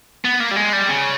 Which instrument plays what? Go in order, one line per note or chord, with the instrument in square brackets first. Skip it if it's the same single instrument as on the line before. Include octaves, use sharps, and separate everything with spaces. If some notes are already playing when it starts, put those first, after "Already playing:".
[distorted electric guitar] B3
A#3
G3
G#3
G3
C#3